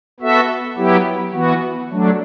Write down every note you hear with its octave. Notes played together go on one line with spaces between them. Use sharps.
B3 F#4 A4 E5
F#3 B3 E4 G4
E3 B3 F#4
F#3 A3 D4